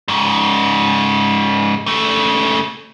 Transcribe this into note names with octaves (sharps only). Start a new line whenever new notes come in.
G#2 C#3
C#3 A3